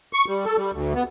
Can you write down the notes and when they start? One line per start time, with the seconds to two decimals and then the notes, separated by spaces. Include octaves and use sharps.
0.13 C#6
0.28 G3
0.45 A4
0.57 G3
0.73 D2
0.95 B3